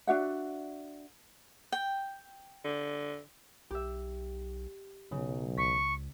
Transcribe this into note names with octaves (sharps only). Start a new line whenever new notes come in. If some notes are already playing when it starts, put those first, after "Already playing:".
D4 F#4 E5 F#5
G5
D3
B1 G4 E5
B1 C#3 F#3
C#2 C#6 B6